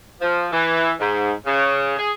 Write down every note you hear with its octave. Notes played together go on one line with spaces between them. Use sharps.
F3
E3
G#2
C#3
G#4